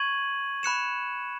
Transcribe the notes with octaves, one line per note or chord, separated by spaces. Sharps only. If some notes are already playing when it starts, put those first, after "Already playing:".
Already playing: C#6 G#6 D#7 F#7
B5 F#6 C#7 E7